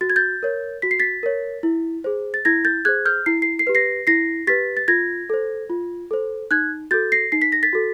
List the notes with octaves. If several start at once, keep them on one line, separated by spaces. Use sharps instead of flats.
F#4 A6
G#6
G6 A6
A#4 C#5
F#4 B6
C7
A6 B6
A#4 C#5
E4
G#4 C5
A6
E4 G#6 A#6
G6 A6
G#4 C5 F#6 G#6
F6 G6
E4 C7
C7
C7
G4 B4
A#6 C7
E4 A#6 C7
G4 B4 A6 B6
A6
F4 G#6 A#6
A4 C5
F4
A4 C5
D#4 F#6 G#6
F#4 A4 G6 A6
A#6 C7
D#4 C7
B6
A#6
A6 B6
F#4 A4